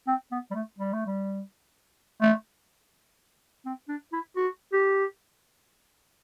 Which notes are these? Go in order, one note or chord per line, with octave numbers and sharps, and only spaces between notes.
C4
B3
G3
A3
G3
A3
G3
A3
C4
D4
E4
F#4
G4